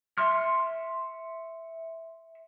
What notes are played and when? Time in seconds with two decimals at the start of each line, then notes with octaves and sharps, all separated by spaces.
0.18 E5 C6 C#6 F6